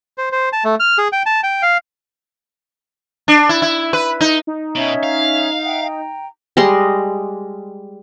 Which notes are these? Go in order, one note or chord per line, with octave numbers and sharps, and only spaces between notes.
C5
C5
A5
A3
F6
G#4
G5
A5
G5
F5
D4
E4
E4
B4
D#4
D#4
B2 C#4 C#5 E5
F5
E5 F#5 G5
G5 A#5
G3 G#3 D#5 C6